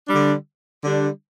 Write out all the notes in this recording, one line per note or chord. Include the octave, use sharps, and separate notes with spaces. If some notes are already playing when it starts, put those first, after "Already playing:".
D3 G3 D4
D3 G3 D4